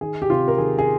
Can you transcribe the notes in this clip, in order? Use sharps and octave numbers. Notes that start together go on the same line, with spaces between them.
D#3 G#4
G4
C3 F4
A#4
D#3 G#4
G#4